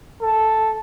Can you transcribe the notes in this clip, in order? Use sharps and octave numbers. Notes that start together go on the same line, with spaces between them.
A4